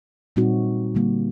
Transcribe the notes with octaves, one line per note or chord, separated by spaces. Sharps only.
A#2 G3 C4 D#4 F#4
D3 G3 A#3